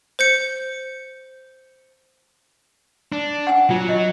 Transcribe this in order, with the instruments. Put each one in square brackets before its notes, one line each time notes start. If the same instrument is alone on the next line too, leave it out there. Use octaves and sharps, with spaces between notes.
[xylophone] C5 G6 C#7
[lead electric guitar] D4
[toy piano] F#5 G#5
[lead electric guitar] F#3 [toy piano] F4
[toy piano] D#5